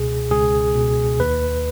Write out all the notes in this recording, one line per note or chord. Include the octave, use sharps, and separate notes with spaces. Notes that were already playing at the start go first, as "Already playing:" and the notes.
Already playing: C#2 B2 G#4
C#2 G#4
B2
D#2 B4